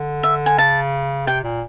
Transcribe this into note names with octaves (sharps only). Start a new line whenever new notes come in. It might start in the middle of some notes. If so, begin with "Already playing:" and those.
Already playing: D3
E5
G#5
C#3 A5
C3 G5
A#2